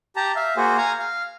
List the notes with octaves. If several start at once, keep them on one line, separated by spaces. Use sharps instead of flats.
G4 A5 A#5
E5 F5
A#3 F#4 G#4 C5
F5 G#5 A#5
F5